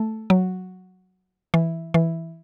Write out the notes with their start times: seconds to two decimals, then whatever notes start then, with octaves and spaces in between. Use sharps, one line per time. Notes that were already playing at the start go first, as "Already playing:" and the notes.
Already playing: A3
0.30 F#3
1.54 E3
1.94 E3